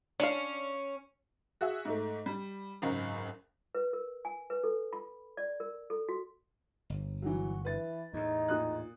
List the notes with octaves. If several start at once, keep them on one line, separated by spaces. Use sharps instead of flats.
C#4 D4 F5
F#4 G#4 E5
G#2 A3
G3
G#1 C#2 F#2
B4
A#4
G#5
B4
A4
B5
D5
A#4
A4
F#4
G1
E3 F#3 F#4
E3 B4 A6
E2 A2 D#4
A#2 D#6 F#6